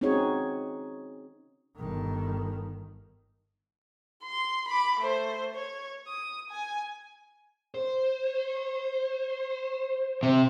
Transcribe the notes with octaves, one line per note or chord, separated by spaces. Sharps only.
C4 C#4 D#4 F#4 G#4 C#5
G1 D#3
C6
B5 D6
A3 C5
C#5
D#6
G#5
C5
C3